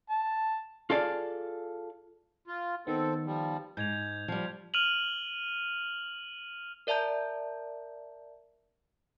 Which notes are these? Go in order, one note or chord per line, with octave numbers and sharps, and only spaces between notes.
A5
F4 G#4 A4 D5 F5
F4
D#3 B3 C4 A4
F3 G3
G#2 G6 G#6 F7
F3 G3
F6 D#7 F7 F#7
A#4 D5 E5 A5 A#5 G6